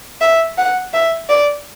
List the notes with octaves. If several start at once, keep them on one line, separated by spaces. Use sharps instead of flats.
E5
F#5
E5
D5